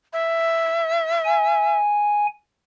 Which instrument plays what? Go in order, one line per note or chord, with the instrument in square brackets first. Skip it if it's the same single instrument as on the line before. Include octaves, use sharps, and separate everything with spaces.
[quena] E5
[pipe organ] G#5